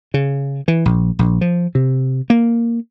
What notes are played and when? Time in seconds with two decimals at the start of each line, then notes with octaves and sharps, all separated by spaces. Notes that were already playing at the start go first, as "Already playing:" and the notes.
0.14 C#3
0.68 E3
0.85 A#1
1.19 A#1
1.41 F3
1.75 C3
2.30 A#3